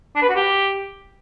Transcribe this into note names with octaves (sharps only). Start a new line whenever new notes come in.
D4
B4
F#4
G4